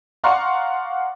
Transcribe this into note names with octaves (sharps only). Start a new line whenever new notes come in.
D5 F5 F#5 A#5 C6 C#6